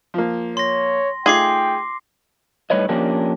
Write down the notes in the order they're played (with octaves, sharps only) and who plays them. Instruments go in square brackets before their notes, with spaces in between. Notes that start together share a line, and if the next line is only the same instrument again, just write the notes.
[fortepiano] F3 A#3
[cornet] C#5 [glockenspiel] C6 A#6
[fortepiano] A3 D#4 F4 [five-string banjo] G#4 [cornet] G5 [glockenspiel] C6 D6 C7
[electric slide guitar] A2 G3 D#4 B4 C#5 D#5
F3 A#3 C#4 D4 G4 A#4